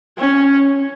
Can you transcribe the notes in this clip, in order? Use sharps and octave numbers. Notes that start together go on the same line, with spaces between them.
C#4